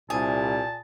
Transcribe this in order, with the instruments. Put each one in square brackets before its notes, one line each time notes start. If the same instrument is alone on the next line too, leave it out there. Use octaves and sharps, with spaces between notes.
[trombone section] C2 [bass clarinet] A#2 [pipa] G#4 [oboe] A5